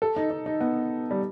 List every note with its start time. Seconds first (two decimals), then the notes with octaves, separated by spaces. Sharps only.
0.02 A4
0.16 D#4
0.30 D#4
0.46 D#4
0.61 B3
1.11 G3